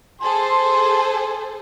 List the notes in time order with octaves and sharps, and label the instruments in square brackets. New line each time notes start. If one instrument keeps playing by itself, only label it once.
[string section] G#4 A4 C5 [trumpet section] C6